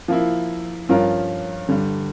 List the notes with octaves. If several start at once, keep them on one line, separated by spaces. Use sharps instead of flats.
F3 A#3 E4
G2 F3 C#4 F4 A#4
G2 D3 G3